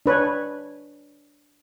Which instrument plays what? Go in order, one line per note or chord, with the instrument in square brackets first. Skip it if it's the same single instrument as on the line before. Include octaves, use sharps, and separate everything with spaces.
[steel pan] D4 B4 C#5